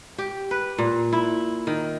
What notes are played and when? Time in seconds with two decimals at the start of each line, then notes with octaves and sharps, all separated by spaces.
0.18 G4
0.51 B4
0.78 A#2
1.13 E4
1.67 D#3